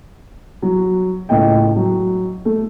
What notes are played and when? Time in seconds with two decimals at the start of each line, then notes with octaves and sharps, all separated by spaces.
0.62 F#3
1.29 C#2 A2 D#5 G5
1.76 F#3
2.45 A3